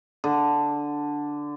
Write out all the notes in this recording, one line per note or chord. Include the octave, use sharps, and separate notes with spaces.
D3